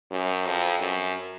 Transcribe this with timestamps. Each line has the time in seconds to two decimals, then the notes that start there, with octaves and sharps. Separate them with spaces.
0.11 F#2
0.45 F2
0.79 F#2